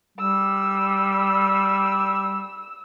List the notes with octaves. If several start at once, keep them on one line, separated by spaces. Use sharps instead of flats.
G3 E6